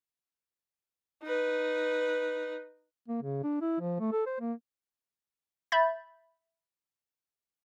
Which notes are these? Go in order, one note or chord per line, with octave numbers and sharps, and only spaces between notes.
D#4 B4
A#3
C#3
D4
E4
F3
A3
A4
C5
A#3
E5 B5 G6 A6